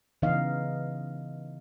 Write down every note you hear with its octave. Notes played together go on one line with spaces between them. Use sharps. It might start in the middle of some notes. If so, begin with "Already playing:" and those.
C#3 E3 B3 D#4 D#5 F5